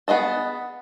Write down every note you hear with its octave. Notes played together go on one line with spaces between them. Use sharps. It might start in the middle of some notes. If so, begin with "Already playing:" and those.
B3 G#4 D#5 A5